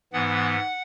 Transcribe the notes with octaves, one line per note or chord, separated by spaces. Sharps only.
G#2 E3 B3 F#5